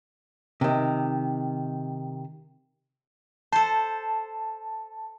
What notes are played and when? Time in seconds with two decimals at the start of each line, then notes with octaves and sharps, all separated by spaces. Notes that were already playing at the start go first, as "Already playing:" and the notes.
0.61 C3 D#3
3.52 A4 C5 A5